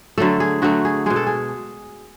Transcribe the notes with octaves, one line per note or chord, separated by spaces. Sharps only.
D3 F#3 A3 A4
G#4
D3 F#3 A3 F#4
G#4
B2 G#3 G#4
A4
G#4